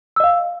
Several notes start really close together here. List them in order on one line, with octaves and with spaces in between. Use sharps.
E6 D#5 F5